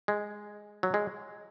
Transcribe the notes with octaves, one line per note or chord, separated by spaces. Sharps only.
G#3
F#3
G#3